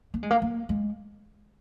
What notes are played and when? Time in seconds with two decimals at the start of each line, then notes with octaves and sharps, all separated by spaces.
0.14 A#3
0.23 G#3
0.31 A#3
0.42 A#3
0.69 G#3